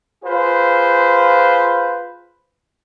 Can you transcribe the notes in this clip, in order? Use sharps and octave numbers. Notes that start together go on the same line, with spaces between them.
F4 G#4 B4 C5